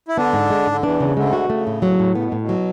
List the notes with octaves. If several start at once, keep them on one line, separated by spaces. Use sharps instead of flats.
E4
D3 B3 D4
G#2
G#3
G#2
D3
E2 E3 D4
C#3
D2 D3 G#3
F#4
B2
C#3 A3
A2
F#3
A2
C#3 B3
B2
A2
B2
F#3